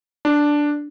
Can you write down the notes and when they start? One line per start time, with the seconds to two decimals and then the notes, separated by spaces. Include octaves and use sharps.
0.25 D4